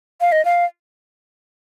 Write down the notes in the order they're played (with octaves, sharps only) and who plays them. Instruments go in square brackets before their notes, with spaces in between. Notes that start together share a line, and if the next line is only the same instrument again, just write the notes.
[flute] F5
D#5
F5